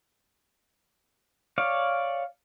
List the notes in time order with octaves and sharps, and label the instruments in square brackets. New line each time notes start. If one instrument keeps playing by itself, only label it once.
[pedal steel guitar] C#5 D5 F5